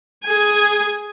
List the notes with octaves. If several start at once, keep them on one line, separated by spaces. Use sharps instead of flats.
G#4 G#5